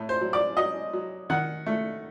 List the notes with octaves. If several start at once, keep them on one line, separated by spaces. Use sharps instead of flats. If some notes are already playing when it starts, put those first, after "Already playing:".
Already playing: A2
C5
F#3
D5
F#3 D#5
F#3
D#3 F#5
A3